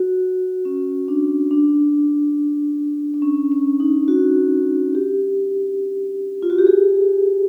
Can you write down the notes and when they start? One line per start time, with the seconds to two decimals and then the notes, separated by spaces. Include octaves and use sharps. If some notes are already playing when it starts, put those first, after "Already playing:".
Already playing: F#4
0.65 C#4
1.08 D4
1.51 D4
3.14 D4
3.22 C#4
3.52 C#4
3.80 D#4
4.08 F#4
4.95 G4
6.42 F4
6.50 F#4
6.58 G4
6.67 G#4